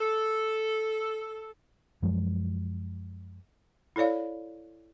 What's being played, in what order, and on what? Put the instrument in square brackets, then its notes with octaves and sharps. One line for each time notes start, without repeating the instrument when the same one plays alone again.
[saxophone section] A4
[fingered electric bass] F#2 F3 F#3 G#3
[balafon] E4 A4 C#5 D5 F5